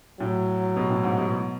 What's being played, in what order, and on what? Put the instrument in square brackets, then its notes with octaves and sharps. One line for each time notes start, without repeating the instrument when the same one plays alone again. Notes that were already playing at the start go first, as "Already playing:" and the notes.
[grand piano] A2 [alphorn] F#3
[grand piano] B2
A2
G#2
B2